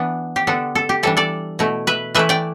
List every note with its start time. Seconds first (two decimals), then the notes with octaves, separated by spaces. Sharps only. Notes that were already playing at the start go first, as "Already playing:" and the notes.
Already playing: E3 B3 D4
0.36 G4
0.47 D3 B3 D4 A4
0.75 A4
0.89 G4
1.03 E3 G3 D4 A4
1.17 A4 D5
1.59 B2 A3 E4
1.87 B4 E5
2.15 E3 A3 E4 B4 E5
2.29 D5 G5